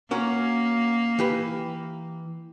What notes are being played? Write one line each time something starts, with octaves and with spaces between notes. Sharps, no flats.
A#3 C#4 F#4 A#4
E3 G4 B4